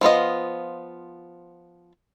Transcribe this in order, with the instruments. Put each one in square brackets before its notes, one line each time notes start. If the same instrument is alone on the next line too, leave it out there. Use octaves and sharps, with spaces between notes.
[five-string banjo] F3 B3 F4 D#5